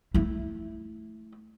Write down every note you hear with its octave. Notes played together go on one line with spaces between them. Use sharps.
A3 E4